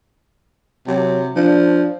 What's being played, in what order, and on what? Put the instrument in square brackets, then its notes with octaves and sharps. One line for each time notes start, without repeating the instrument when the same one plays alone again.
[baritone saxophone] C3 [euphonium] F#3
[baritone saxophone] F3 [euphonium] D4